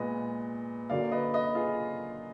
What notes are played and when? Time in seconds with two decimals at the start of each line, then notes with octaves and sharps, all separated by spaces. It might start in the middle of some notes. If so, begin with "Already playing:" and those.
Already playing: A#2 G#3 B3 B4 D#5
0.90 F#2 D3 F#3 A#3 D5 F5
1.12 B4 D#5
1.33 B4 D#5
1.55 F4 G#4